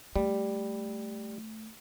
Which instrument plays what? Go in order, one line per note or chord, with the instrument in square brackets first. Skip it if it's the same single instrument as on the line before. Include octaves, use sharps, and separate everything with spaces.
[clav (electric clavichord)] G3 [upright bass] A3